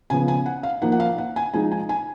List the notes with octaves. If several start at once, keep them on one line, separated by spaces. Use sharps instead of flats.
C#3 F3 B3 G#5
G#5
F#5
F5
F3 A#3 D#4 F#5
F#5
F5
F#5
G#5
F3 G#3 D#4 G#5
G#5
G#5